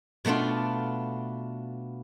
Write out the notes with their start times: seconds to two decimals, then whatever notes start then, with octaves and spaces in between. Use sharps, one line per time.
0.25 B2 A3 B3 D4 F4